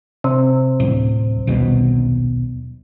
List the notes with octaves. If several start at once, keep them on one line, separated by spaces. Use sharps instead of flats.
C3
D1
D#1 B1 B2